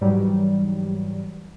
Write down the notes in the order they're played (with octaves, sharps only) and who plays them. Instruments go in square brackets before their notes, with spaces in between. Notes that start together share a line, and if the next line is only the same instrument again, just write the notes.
[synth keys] G#2 E3 F#3 G3